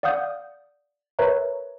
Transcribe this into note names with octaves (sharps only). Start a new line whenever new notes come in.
D5 F5 F#5 D#6 G6
A#4 B4 C#5 E5 A#5